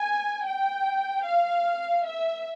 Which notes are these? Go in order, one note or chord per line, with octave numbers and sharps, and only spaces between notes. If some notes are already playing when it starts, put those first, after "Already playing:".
Already playing: G#5
G5
F5
E5